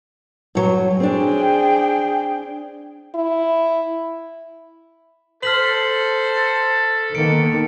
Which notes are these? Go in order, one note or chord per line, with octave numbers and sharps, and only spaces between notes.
G2 F#3
C4 D4 G#4 G5
E4
A4 C5 F6 B6 F#7
D#3 A#3 B3 C#7 D7